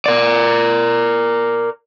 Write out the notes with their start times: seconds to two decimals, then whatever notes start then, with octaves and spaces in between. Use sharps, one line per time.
0.06 A#4 D5